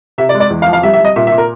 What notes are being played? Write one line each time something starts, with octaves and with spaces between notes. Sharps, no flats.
C3 E5
D5
G#3
D5
E2
F5
F3
F5
G3 E5
E5
G3 D#5
A#2 E5
E5
A#2
A#4